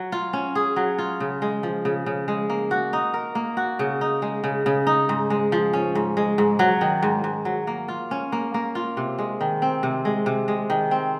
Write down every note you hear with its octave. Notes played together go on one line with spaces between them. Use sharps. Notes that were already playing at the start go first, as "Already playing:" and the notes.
Already playing: F#3
F4
C#4
G#4
F#3
F4
C#3
G#3
F3
C#3
C#3
G#3
A#3
F#4
D#4
A#4
A#3
F#4
C#3
D#4
G#3
C#3
C#3
D#4
G#2
G#3
F3
C#4
G#2
G#3
G#2
F#3
D#3
G#2
G#2
F#3
A#3
F4
C#4
A#3
A#3
F4
C3
G#3
D#3
C4
C3
G#3
C3
G#3
D#3
C4